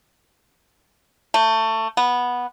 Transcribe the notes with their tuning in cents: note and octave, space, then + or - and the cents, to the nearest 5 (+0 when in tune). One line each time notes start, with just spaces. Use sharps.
A3 +20
B3 -10